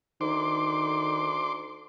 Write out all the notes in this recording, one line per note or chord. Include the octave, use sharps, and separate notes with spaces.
D2 D#3 C6 D6